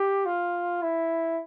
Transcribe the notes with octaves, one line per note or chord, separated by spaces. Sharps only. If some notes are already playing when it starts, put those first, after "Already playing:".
Already playing: G4
F4
E4